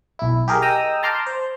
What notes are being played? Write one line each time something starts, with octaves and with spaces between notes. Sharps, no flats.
B1 E4
G4 G#4 A#4
D#5 G5 A#5 D#6 E6
A5 A#5 C6 D6 F6 G6
C5